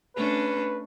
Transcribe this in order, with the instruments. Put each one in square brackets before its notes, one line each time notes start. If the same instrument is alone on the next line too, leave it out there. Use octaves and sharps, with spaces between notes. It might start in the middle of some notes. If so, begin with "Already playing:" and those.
[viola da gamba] A3 C#4 D4 [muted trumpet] B4